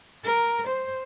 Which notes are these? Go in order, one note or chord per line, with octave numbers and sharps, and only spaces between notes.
A#4
C5